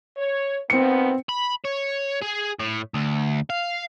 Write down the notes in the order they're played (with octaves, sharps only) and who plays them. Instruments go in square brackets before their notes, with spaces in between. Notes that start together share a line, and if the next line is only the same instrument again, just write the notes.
[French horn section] C#5
[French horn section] D#3 F3 B3 [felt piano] C4 C#7
[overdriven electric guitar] B5
C#5
G#4
A2
D2
F5